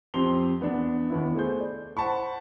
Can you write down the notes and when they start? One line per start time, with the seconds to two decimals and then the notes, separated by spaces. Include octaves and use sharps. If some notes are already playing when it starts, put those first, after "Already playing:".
0.14 F2 C4 G4 C6 F7 G7
0.60 E2 B3 D4
1.10 D#2 B3 E4
1.35 A3 G#4 C5 G6
1.60 D5
1.97 C5 F#5 A5 B5 C#6